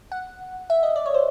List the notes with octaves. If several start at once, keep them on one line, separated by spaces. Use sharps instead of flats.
F#5
E5
D#5
D5
C#5
C5